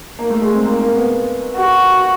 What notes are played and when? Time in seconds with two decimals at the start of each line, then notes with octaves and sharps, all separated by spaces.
0.19 A#3
0.30 A3
0.41 G#3
0.54 C4
0.64 A#3
0.79 A#3
0.96 B3
1.56 F#4